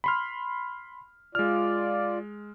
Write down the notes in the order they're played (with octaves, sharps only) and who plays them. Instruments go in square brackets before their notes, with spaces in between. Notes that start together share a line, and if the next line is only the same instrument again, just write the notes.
[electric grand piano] B5 C6 F6
[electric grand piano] G#3 F6 [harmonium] F4 D5